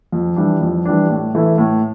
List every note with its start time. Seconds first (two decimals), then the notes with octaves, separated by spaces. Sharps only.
0.12 F2
0.36 E3 G3 D4
0.61 F2
0.85 E3 G3 D4
1.10 A2
1.35 E3 A3 E4
1.58 A2